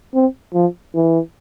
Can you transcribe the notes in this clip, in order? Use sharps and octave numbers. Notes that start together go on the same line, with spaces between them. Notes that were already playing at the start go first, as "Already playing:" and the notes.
C4
F3
E3